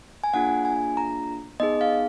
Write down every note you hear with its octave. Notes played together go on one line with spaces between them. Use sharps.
G#5
A#3 D4 F4 G#4 F#5
G#5
A#5
B3 D#4 G#4 D#5
F5